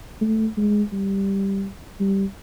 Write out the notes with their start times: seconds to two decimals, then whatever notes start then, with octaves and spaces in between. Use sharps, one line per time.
0.21 A3
0.57 G#3
0.92 G3
2.00 G3